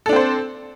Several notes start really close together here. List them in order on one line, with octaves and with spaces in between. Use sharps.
A4 D4 C4 C5